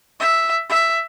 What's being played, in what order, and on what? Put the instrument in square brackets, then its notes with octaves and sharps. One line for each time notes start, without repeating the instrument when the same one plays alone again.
[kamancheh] E5
E5